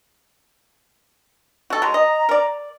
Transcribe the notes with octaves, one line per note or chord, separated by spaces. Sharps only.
F#4 A4
F#3 G#3 A#5
D#5
A#4 D5